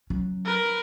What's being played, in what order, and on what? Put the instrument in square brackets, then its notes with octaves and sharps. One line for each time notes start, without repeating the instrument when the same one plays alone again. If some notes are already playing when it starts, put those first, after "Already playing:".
[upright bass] F#3 C#4
[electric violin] A#4 B4